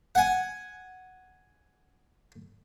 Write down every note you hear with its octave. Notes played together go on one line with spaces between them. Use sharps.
F#5 G#5